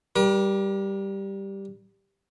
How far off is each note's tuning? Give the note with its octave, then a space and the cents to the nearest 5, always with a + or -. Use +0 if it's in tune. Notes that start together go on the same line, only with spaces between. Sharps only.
G3 +0 A#4 +40